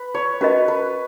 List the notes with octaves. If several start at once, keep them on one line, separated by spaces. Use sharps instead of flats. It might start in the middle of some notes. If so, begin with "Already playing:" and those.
Already playing: B4
C#5
C#4 F#4 A#4 B4 D#5
B4